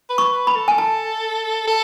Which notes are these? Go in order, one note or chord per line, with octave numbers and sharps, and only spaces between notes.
B4
C#6
B4
B5
A4
G#5
A5
A4